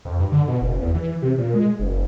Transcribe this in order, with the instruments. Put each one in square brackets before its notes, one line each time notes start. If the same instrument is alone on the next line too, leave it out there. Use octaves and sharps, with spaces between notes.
[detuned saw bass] F2
G2
D3
B2
F#1
E2
E3
C3
A#2
G#3
F#1